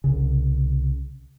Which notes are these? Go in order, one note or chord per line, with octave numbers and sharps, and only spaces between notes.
C2 C#3